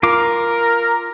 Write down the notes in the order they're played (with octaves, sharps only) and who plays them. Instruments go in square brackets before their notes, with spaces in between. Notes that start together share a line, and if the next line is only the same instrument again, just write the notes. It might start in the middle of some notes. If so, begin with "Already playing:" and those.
[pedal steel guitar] F4 D6 [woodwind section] A#4